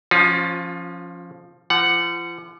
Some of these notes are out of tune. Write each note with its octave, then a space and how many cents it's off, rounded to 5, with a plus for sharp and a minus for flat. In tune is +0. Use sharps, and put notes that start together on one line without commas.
F3 +0 C#4 -10 F4 +30
F3 -40 F#5 +0